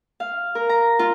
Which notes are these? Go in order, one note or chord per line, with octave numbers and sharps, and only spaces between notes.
F5
A#4
A#5
F4